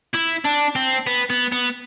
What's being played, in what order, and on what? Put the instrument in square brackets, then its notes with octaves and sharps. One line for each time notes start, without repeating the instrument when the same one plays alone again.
[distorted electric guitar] E4
D4
C4
B3
B3
B3